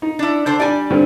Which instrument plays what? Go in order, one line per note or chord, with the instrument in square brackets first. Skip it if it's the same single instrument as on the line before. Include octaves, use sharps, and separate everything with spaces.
[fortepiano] D#4
[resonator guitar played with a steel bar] D4 E4
D3 D4 C5
[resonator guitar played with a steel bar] G3 G#5 [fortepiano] D4 D5
[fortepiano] G2 D3 C4